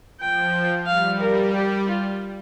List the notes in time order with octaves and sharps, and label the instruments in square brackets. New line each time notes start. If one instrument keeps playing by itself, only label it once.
[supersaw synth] F3 [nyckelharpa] G5
[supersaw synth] G3 [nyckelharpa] F5
[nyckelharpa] A#4
G4
F4